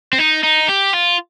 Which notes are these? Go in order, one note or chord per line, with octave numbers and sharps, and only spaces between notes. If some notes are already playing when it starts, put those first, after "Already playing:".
C4
D#4
D#4
G4
F4